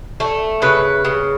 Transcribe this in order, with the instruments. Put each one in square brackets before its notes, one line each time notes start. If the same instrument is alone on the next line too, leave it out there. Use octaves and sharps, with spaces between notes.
[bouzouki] A3
C#3 B4
C#3